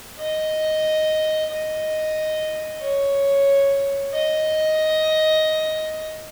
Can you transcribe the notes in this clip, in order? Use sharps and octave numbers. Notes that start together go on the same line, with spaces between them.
D#5
D#5
C#5
D#5